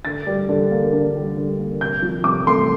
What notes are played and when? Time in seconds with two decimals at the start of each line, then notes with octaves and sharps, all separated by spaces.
0.05 D3 A6
0.27 G3
0.49 D3
0.71 A#3
0.93 D3
1.15 G3
1.37 D3
1.58 A#3
1.81 C3 G6
2.02 F3
2.24 C3 D6
2.46 A3 C6